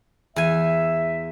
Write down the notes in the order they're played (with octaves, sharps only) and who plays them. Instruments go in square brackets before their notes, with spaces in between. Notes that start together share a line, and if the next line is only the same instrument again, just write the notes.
[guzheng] E2 G#5 [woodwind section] E5